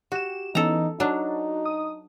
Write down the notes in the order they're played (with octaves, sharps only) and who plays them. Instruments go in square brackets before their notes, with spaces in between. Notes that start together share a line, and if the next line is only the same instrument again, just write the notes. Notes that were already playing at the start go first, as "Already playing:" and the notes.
[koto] F#4 [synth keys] G4 E7
[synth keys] E3 B3 C#4 [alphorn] D#4 [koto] A4 A#5
[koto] F#3 D4 [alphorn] D#4 [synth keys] F#4
[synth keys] D#6